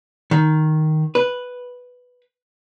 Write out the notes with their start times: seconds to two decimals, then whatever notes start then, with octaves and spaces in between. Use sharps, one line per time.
0.31 D#3
1.15 B4